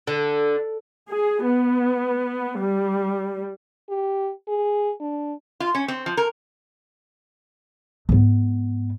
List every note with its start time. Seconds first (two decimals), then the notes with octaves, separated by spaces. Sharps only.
0.07 D3
1.09 G#4
1.44 B3
2.59 G3
3.90 G4
4.48 G#4
5.00 D4
5.60 F4
5.75 C#4
5.88 C4
6.06 F3
6.17 A#4
8.09 G#2 B3